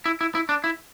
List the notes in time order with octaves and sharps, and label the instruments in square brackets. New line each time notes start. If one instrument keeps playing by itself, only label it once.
[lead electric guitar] E4
E4
E4
D4
E4